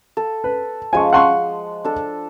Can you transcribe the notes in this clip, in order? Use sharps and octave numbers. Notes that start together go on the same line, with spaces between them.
A4
B4
F3 G#3 G#5 C#6
F#5 C6 C#6
D4 A4